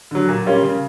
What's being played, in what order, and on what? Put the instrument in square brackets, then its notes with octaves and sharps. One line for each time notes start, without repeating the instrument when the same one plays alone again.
[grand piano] D3 F#3
A#2
G3 A#3 C#4 F4
C#3